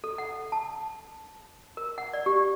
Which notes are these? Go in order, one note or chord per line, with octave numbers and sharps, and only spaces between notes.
A4
F#5
A5
A#4
F#5
D5
G4